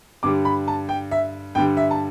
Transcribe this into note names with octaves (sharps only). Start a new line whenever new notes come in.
G2 D3 G3 D6
B5
A5
G5
E5
G2 D3 G3 G5
E5
A5